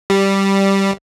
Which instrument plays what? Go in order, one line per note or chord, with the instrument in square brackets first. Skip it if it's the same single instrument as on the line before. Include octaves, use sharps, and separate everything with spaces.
[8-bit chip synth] G3